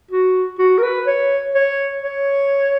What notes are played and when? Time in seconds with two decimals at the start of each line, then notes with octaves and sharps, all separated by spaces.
0.11 F#4
0.59 F#4
0.78 A#4
0.83 B4
1.07 C#5
1.55 C#5
2.02 C#5